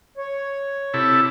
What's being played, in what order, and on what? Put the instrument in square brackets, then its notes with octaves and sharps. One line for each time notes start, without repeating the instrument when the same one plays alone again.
[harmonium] C#5
[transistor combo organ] C3 E4 A4